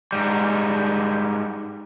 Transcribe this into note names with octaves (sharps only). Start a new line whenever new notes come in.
G#2 G3